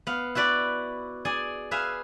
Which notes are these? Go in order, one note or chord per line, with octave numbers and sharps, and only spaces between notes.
B3 F5
E4 F#4 B4 D5
G#4 D5 G#5
G#4 B4 E5 F5